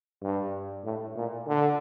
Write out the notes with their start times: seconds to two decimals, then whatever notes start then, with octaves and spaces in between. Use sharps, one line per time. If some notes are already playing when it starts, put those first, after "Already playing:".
0.22 G2
0.85 A2
1.16 A#2
1.47 D3